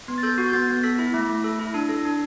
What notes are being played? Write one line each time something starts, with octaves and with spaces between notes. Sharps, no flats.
B3
A6
A4 G6
F#4
G6
B3 A6
B3
A4 B6
E4
A3
A3
A4
E4
D4
A4
D4